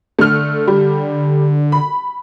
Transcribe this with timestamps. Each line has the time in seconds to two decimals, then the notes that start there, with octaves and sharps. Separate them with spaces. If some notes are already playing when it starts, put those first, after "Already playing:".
0.19 D3 A3 F6
0.67 G3
1.72 B5